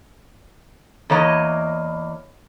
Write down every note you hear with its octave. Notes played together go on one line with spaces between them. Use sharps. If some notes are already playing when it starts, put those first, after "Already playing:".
E2 A#3 C#5 D#5